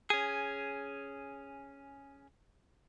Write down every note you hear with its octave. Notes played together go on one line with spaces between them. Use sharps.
C#4 G#4